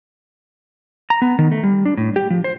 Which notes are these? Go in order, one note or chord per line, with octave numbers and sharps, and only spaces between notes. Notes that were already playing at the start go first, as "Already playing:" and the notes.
A#5
B3
D#3
A3
G3
D4
A2
G4
F3
C5